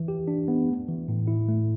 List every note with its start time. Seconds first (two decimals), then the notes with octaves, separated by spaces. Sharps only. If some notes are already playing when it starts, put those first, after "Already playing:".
Already playing: E3
0.08 G4
0.28 D4
0.48 B3
0.68 A3
0.89 E3
1.08 A2
1.28 E4
1.48 A3